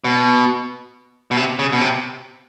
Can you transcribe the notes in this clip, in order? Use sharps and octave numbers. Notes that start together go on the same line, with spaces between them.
B2
B2
C3
C#3
B2
C3